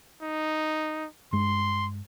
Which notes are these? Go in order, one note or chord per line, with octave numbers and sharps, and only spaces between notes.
D#4
G2 G#3 C6